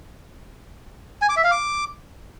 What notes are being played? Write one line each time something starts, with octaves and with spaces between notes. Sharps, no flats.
G#5
D6
E5
F5
D6